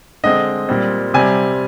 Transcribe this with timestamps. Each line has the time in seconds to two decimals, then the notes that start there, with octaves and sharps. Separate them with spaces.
0.24 D3 G#3 C4 D#5
0.69 A#2 G3 C4
1.14 C3 G3 C4 G#5